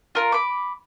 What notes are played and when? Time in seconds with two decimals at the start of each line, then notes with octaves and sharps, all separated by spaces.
0.15 F4 A#4
0.32 B5 D6